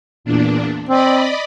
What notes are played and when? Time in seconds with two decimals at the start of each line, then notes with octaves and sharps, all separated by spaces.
0.24 E2 A#2 D4
0.89 C4 D5 D#5 B5